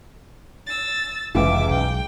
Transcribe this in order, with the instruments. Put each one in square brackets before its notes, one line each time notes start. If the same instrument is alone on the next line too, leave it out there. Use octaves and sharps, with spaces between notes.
[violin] E6 A6
[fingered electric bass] F1 [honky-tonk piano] C#2 E3 [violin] E5 D6
[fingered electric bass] B1 [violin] G5